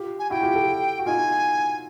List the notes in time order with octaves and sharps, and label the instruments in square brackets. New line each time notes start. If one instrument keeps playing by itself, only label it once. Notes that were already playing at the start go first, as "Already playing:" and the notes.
Already playing: [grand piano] F4 G4
[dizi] G#5
[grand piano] E4 F#4 [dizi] G5
[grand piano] F4 G4
G4 A4
F#4
[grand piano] D#4 F4 [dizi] G#5